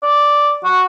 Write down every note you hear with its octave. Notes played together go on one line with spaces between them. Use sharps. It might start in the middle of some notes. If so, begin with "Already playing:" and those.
D5
F#4